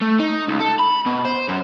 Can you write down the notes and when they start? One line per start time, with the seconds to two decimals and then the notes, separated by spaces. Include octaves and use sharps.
0.02 A3
0.20 D#4
0.49 C#2
0.60 A4
0.80 B5
1.06 B2
1.25 C5
1.49 F#2